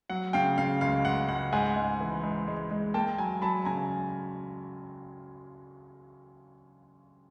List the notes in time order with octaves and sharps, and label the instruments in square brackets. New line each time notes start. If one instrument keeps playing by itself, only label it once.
[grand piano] F#3 F#5
C#3 F5 G5
C#3 F5
C#2 F5
C#2 F#5
C#2 F#5
G#2 F#5 G#5
G#2
E3
G#2
G#3
G#3
A#3 G5 A5
F#3 G#5 A#5
F#3 A5 B5
C#3 G#5 A#5